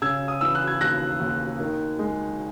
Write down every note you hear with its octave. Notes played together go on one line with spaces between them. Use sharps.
C#3 E6 G#6
D#6
E3 E6
F#6
G#6
D#2 F#6 A#6
D#2
D#3
G#3